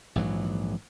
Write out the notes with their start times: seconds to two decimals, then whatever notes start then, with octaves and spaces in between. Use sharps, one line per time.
0.16 A#1 G#2 E3 F#3